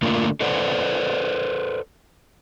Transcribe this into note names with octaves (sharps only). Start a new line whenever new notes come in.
D3 A3 A#3 D4 F4 A#4
A4 B4 C5 D5 F#5